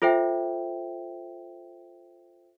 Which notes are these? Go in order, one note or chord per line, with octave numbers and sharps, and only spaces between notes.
F4 A4 C5 E5 G5